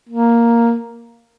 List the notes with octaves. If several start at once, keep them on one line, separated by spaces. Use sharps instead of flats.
A#3